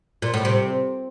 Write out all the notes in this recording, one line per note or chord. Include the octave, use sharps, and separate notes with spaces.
A#2
A2
C3